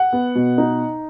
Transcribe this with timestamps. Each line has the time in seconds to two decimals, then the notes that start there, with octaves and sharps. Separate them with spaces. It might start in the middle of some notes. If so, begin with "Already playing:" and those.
Already playing: F#5
0.13 B3
0.35 B2
0.58 D#4